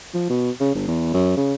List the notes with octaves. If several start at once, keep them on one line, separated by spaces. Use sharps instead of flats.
F3
B2
C#3
G1
E2
F#2
C#3